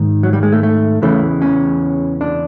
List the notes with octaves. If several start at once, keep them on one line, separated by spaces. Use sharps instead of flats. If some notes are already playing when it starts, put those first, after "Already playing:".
Already playing: G#2 D#3
F#3
G3
G#3
A3
A3
E2 C#3 E3 A3
C#4
D4